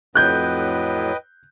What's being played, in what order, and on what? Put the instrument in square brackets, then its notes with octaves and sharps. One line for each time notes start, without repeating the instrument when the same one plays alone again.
[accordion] F2 A2 F#3 [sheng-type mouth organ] B4 D#5 G5 [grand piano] F#6 G6